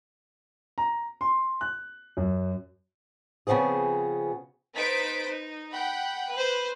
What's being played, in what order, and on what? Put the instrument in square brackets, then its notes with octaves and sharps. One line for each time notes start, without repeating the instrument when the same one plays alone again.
[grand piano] A#5
C6
F#6
F#2
[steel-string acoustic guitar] C#3 F3 B3 C4 G#4
[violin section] D#4 B4 C5 A6 B6 D7
D#4
F#5 G5 B5
B4 C5